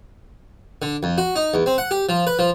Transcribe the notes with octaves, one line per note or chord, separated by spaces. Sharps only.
D3
F2
F#4
D#4
E2
C4
F#5
G4
F3
B4
F3